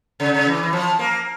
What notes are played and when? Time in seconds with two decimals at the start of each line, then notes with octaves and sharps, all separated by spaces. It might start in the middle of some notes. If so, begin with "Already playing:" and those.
0.20 C#3
0.34 C#3
0.47 E3
0.63 E3
0.73 F3
0.99 A#3